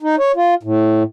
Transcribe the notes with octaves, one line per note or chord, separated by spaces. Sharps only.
D#4
C#5
F4
A2